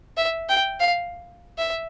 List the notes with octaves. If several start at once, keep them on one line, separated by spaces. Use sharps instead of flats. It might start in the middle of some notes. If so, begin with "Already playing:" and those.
E5
G5
F5
E5